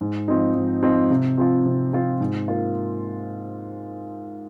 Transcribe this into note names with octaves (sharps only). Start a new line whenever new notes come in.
G#2
F3 C4 D#4
G#2
F3 C4 D#4
C3
F3 C4 F4
C3
F3 C4 F4
G#2
A#3 F4